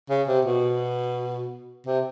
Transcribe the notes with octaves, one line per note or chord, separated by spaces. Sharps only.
C#3
C3
B2
C3